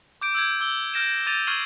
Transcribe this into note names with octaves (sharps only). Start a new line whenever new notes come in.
D6 G6 D7
E6 G6 G#6
D6 E6 G7
F6 G6 A#6 D7 E7
D6 G6 A6 D#7 F7
C#6 F6 G#6 C7 D#7 F#7